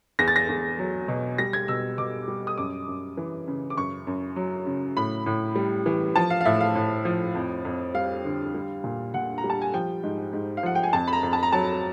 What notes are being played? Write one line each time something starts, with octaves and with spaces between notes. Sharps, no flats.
E2 A#6
A6
A#6
E2
F#3
B2
G3 A#6
G#6
B2 E6
B2 D6
G3
D#6
F#2 D6
F#2
E3
C#3
D6
F#2 C#6
F#2
F#3
C#3
A2 B5
A2
G3
E3
F3 A5
F5
F5
A2 E5
F5
A2
F3
F2
F2
G3 F5
D3
G3
A#2
A#2 F#5
A#5
G3
A5
G#5
F3 G5
G#2
G#2
F5
F3 F#5
G5
G#5
F2 A5
B5
A#5
F2
A5
A#5
F#3 A5